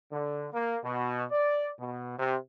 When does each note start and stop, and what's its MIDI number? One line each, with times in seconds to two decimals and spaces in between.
0.11 0.47 50
0.52 0.77 58
0.83 1.23 47
1.31 1.68 74
1.78 2.17 47
2.17 2.36 48